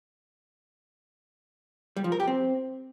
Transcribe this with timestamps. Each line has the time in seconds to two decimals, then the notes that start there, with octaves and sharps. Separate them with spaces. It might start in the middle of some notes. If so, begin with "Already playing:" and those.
1.96 G3
2.04 F3
2.12 A#4
2.20 G4
2.27 C4